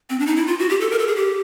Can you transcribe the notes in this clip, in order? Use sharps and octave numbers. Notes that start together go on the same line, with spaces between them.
C4
D4
D#4
E4
F4
F#4
G4
A4
A#4
A4
G#4
G4